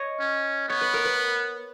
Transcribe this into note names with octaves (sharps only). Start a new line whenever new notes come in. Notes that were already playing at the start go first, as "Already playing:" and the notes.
Already playing: C#5 D#5
C#4
B3 C#5
B4
A#4
B4